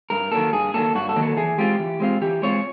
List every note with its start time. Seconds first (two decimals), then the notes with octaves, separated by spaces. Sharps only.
0.10 G2 A#4
0.32 D#3 F#3 A#3 A4
0.52 G2 G#4
0.74 D#3 F#3 A#3 A4
0.95 G2 F#4
1.09 A4
1.16 D#3 F#3 A#3
1.23 A4
1.37 E3 G#4
1.58 G#3 C4 F4 G4
1.79 E3
2.00 G#3 C4 F4
2.21 E3 G4
2.42 G#3 C4 F4 C#5